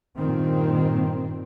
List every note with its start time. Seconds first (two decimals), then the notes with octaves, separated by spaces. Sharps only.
0.16 G2 A#2 D#3 C4